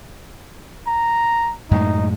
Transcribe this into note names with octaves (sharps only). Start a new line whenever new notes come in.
A#5
F#2 A2 G#3 D#4